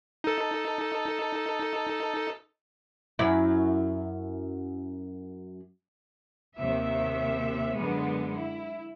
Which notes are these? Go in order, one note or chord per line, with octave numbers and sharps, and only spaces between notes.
D#4 A4
F#2 E4
D#2 C3 E5
F#2 D3 G#3 B3
E4